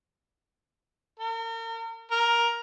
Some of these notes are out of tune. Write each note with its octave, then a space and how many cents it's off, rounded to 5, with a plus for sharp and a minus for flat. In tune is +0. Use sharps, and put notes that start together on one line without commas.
A#4 -40
A#4 +10